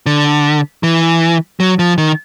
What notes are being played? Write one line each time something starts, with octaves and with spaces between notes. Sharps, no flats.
D3
E3
F#3
F3
D#3